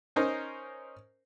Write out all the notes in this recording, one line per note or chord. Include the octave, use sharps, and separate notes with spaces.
C#4 D#4 A#4 C5